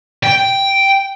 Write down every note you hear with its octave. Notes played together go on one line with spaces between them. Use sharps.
G5